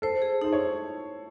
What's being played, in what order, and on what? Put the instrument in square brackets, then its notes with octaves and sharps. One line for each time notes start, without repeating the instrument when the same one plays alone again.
[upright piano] A4 [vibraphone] C5
[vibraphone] G#4
[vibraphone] D#4 [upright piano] C5
[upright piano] C#5